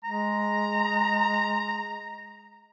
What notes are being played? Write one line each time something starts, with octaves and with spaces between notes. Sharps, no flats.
G#3 A#5